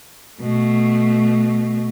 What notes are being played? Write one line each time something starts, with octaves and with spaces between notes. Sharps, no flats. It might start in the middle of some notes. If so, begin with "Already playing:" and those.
B2 A3